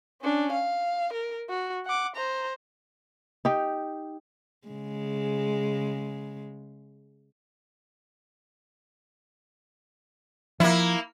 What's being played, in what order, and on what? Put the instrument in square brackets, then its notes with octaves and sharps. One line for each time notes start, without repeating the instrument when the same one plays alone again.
[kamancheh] C#4 D4
F5
A#4
F#4
F#5 D6
C5 A#5
[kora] D#4 G4
[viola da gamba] C#3 G#3
[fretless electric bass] F3 [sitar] A#3 E4